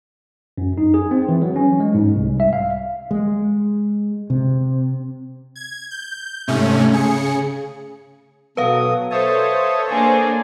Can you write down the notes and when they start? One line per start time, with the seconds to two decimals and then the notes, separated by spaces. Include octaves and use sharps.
0.58 F#2
0.78 D#4
0.94 G#4
1.11 C4
1.28 E3
1.42 F#3
1.56 C#4
1.80 G#3
1.94 G#2
2.15 C2
2.40 E5
2.53 F5
3.11 G#3
4.30 C3
5.56 G#6
5.91 G6
6.48 G#2 C3 A3 C#4
6.91 C#3 G#4 C#7
8.57 B2 F#3 A4 B4 F5 D#6
9.11 A4 C5 C#5 E5 A5 D#6
9.89 A#3 D4 G#4 D5 G#5